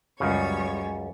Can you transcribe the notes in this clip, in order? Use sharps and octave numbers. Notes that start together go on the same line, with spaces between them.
C#2 F#2 C#3 G3 C#5